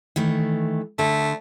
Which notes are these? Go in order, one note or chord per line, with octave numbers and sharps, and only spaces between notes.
D#3 E3 A3
D3 A3